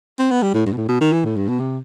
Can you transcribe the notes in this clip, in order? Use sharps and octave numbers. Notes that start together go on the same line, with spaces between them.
C4
B3
G3
A2
G2
B2
A2
B2
D#3
E3
A2
G2
B2
C3